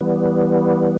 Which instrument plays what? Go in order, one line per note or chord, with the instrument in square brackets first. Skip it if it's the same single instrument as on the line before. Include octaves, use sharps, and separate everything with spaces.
[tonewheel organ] E3 G3 B3